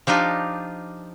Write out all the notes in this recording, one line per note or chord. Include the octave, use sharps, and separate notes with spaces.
F3 D4 D#4 F4 G4